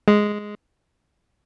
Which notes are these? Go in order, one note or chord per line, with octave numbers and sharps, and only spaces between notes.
G#3